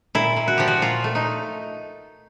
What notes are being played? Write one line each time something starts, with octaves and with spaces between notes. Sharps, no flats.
A#2 E4
A#2
F#4
F3 G4
F#4
A#2 F4
A3
D#4